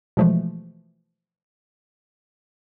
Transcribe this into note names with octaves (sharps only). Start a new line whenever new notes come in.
B2 E3 F3 G#3 A3